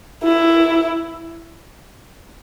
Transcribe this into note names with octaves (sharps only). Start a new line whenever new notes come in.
E4